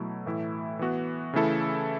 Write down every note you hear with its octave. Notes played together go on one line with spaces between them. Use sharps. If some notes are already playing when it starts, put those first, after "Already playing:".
Already playing: B2 F#3 A3 E4
A2 E3 A3 E4
E3 B3 F#4
C#3 E3 A3 E4 A4